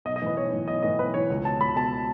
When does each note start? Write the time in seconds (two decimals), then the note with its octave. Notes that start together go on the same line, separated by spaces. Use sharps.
0.05 B1 D#5
0.16 D#5
0.22 A2 E3 B4
0.37 B1 C#5
0.52 A2 E3
0.68 B1 D#5
0.83 A2 E3 D#5
0.99 B1 B4
1.14 A2 E3 C#5
1.30 C#2
1.45 B2 A5
1.60 C#2 B5
1.76 B2 A5